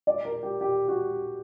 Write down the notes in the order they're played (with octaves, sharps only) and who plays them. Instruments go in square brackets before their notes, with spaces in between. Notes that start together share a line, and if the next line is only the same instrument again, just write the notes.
[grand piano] D5
A#4
G4
G4
F#4